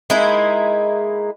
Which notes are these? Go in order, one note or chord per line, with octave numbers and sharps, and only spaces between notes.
G#3 A#3 D#4 E4